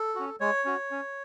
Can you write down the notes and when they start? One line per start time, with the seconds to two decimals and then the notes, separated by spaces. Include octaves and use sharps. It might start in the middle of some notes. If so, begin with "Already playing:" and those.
Already playing: A4
0.15 C#4 F#4
0.40 G#3 C#5
0.65 C#4 F#4
0.91 C#4